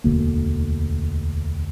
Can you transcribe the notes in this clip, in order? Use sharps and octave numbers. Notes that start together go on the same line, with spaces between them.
E1 D2 A#3